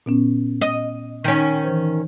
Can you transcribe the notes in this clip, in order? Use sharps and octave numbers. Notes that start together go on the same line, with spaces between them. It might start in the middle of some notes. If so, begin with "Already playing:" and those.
A#2 B3 C#4
D#5
D#3 C#4 D#4
E3 C5